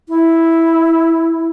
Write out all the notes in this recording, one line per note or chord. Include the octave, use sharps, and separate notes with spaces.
E4